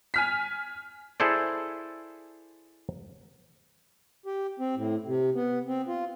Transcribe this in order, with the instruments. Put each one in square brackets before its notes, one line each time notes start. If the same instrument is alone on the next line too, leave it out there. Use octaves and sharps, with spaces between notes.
[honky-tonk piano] G#5 F6 B6
[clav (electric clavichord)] E4 G#4 A4 C5 D5
[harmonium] G4
C4
A2
C3
B3
C4
F4